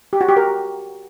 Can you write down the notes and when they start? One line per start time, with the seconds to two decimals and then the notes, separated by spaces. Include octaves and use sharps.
0.13 G4
0.21 F#4
0.29 G4
0.37 A#4